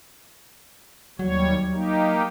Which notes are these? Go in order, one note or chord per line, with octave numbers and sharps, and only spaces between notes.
D#2 F#3 G3 C#5
A#3 D#4 G4